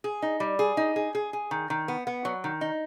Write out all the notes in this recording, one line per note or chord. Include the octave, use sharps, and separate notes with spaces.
G#4
D#4
G3
G#4
D#4
G#4
G#4
G#4
D#3
D#3
B3
B3
F#3
D#3
D#4